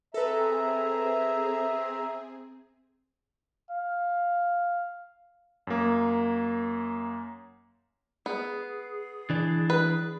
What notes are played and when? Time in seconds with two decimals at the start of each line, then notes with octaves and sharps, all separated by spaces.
0.14 C4 G#4 A4 B4 E5 A#5
3.71 F5
5.67 F#2 A#3
8.26 B3 G#4
9.30 E3 D4
9.70 B4